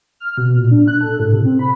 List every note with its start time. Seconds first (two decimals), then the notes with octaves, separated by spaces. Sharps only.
0.20 F6
0.37 B2
0.57 A#2
0.71 D4
0.88 F#6
1.01 A4
1.20 A2
1.32 C3
1.45 C4
1.59 B5